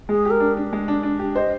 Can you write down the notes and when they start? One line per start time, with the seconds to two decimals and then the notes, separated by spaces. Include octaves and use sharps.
0.09 G#3 G#4
0.25 G4
0.30 A#4
0.40 D4
0.57 D4
0.73 G#3
0.88 D4
1.03 D4
1.19 G4
1.35 C5 D#5